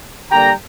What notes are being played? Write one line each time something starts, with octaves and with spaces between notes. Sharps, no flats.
D3 G3 A#3 G5 A#5